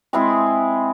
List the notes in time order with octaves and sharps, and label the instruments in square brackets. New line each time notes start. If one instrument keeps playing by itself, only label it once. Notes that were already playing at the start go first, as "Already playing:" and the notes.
[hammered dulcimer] G#3 C4 E4 G#4